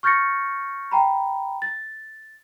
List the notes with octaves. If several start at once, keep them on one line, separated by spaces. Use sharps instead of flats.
C#6 F6 G6 A6 A#6 C#7
G5 A#5 B5
A6